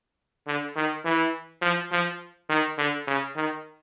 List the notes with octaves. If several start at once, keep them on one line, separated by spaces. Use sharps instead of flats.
D3
D#3
E3
F3
F3
D#3
D3
C#3
D#3